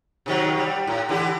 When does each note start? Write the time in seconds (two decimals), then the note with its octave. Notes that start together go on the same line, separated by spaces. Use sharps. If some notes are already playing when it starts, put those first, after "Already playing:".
0.26 C3 D#3 F#3
0.58 G3
0.87 A2
1.09 D3 E3 G4